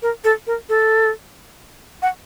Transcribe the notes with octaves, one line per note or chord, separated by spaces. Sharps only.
A#4
A4
A#4
A4
F#5